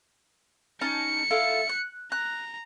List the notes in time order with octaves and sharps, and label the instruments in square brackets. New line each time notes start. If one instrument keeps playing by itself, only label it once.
[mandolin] C#4 D#4 A5 [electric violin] C#7
[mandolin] E4 F4 A4
F#6
[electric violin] A#5 [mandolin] F#6